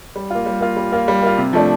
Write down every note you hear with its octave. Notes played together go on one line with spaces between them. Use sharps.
G3
A#3 F4
G3
A#3 F4
G3
A#3 F4
G3
A#3 F4
C3
F3 A3 D4